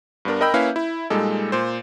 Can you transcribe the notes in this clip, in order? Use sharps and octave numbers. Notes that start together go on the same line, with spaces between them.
G2 B3 D4 A#4
A#4 D#5 G5 B5 E6 G6
A#3 C#4 E4 B4 E5 F5
E4
A#2 G3 G#3 D#4 A4
A#2 C5